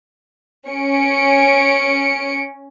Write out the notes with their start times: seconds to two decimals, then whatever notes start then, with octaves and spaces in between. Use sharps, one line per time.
0.69 C#4 C#7 D7